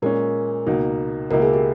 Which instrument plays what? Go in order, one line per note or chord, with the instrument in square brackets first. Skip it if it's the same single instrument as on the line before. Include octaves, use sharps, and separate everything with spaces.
[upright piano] A#2 G#3 C#4 [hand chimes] A#4
[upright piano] C#2 B2 A#3 D#4
[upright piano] C#2 B2 A#3 E4 [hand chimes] A#4
[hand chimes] G#4
G4